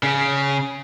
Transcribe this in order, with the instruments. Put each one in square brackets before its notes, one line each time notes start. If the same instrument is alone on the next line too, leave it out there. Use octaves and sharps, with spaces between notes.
[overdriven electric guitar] C#3